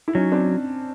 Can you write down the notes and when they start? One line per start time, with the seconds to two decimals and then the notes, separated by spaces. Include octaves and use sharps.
0.08 E4
0.15 F#3 C#4 D#4
0.32 C4 D4